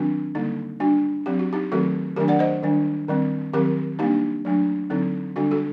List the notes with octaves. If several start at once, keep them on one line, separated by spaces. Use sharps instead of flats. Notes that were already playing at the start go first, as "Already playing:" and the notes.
Already playing: D#3 F#3 C4 D4 F#4
D3 G3 A#3 D#4
G3 D4 F#4
F#3 C4 G4
F#4
D#4 G4
D#3 F#3 A3 C4 F#4 A4
D#3 F#3 A3 D4 G4 A#4
D5 F#5
C5 D#5
D#3 G3 D4
D#3 G3 C4
D#3 F#3 C4 G4 A#4
G3 A#3 D4 D#4 G4
F#3 A3 D4
D3 F#3 C4 D#4
D3 G3 D4 F#4
F#4 A4